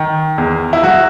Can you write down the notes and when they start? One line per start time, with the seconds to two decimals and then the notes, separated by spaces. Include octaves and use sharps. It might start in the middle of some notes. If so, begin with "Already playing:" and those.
Already playing: D#3
0.38 E2
0.73 E4
0.83 F#3 F#4